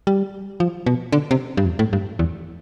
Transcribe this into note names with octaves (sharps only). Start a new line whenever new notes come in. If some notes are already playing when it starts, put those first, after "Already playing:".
G3
F3
B2
D3
C3
G2
F2
A2
G2
E2